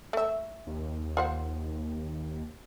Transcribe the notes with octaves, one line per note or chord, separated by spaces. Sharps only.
A3 E5
D#2
F4 C5 F#5